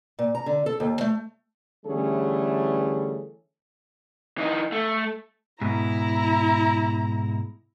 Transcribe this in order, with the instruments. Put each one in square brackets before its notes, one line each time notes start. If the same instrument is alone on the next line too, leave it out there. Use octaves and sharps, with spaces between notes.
[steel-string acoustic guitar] A#2
A#5
D3
A4
D#2
A3
[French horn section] D3 E3 G3 A3 C#4 G#4
[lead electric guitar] E3 D#4
A3
[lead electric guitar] G#2 B2 [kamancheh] E4 A#5